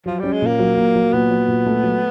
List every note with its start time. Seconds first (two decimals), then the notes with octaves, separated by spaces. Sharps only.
0.06 F3 F#3
0.19 G3 C#4
0.33 G#3
0.42 A#2 A#3
0.59 F#3
0.77 A#2
0.96 F#3
1.13 A#2 B3
1.31 F#3
1.48 A#2
1.66 A3
1.84 F#3